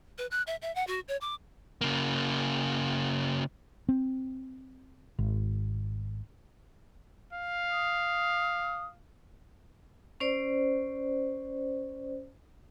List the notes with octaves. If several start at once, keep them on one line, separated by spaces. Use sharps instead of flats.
B4
F#6
E5
E5
F#5
F#4
C#5
D6
C#3 A#3
C4
G#1
F5
D#6
C#4 C5 D5